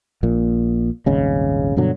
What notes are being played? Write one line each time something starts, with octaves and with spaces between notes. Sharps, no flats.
A#1 A#2
D#1 G#1 C#3 G#3
G2 B2 D3 F#3